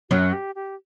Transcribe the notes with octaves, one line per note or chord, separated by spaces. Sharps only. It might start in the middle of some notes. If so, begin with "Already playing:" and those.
F#2 F#3 F#4
G4
G4